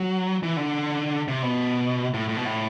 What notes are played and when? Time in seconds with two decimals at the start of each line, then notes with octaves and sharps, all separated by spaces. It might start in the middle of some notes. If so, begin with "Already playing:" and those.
Already playing: F#3
0.43 E3
0.57 D3
1.28 C3
1.43 B2
2.14 A2
2.29 A2
2.36 B2
2.45 A2